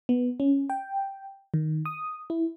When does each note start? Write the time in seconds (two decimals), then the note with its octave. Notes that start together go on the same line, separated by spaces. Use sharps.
0.09 B3
0.40 C#4
0.70 G5
1.54 D#3
1.86 D#6
2.30 E4